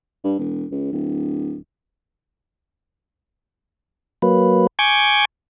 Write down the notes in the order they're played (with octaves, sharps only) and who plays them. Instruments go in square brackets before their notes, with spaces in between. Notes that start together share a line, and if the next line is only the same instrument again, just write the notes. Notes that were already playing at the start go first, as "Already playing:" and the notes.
[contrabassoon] G2
E1
C#2
D1
[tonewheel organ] F#3 A#3 B4
G#5 C#6 D6 G6 G#6